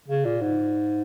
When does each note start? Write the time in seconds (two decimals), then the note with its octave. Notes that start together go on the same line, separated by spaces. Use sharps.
0.08 C#3
0.25 A#2
0.41 G#2